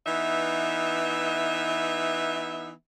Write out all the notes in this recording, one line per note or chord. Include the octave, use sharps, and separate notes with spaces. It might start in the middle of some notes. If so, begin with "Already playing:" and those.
E3 B3 D#4 E5